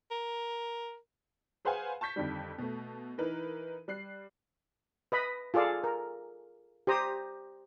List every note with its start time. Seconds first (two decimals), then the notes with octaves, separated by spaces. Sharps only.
0.11 A#4
1.65 G#4 B4 C5 F5 F#5 G#5
2.01 A5 C#6 G6 B6
2.16 F2 D3 D#3 G3
2.58 B2 A3
3.18 E3 D#4 A#4 B4
3.88 G3 F#6 C7
5.12 B4 D#5 B5
5.54 F4 G#4 A4 D5 F5
5.84 A#4
6.87 G4 C5 A#5 D#6